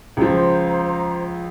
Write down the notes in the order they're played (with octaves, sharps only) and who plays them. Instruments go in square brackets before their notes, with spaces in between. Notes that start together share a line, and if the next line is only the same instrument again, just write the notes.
[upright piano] C#2 F3 [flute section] C5 A#5